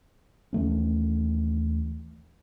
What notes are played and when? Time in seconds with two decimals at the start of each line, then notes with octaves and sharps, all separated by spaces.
0.53 D#2 E3 A3 C#4